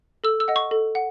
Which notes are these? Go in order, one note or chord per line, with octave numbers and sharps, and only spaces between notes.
A4 E6
E6
D#5 F#5
C#6
A4
F#5